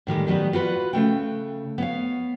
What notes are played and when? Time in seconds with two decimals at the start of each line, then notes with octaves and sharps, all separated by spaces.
0.07 A2 D#3 G3 G#3
0.27 D#3 F#3 G3 B3 B4
0.53 F4 F#4 B4 F#5
0.93 C#3 F3 A3 G5
1.78 B3 C#5 F5